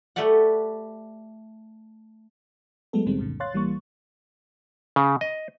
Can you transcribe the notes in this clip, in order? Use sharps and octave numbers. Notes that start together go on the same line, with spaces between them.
A3 G4 B4 D5 F#5
F#3 G#3 A3 B3 A4
C#2 A#2 D#3 G3 G#3 C4
C#2 F#2 A#2 D3
C#5 F5 C6 F#6 A6
A#1 E3 G3 A#3 C#6
C#3
D#5